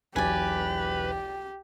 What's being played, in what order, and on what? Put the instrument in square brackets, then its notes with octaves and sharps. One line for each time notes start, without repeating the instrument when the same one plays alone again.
[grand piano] E1 B1 [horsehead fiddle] G4 [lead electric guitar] B4 [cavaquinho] D5 G#5